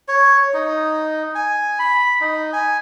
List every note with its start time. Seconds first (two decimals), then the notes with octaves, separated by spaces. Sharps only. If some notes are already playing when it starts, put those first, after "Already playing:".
0.08 C#5
0.54 D#4
1.35 G#5
1.79 B5
2.21 D#4
2.53 G#5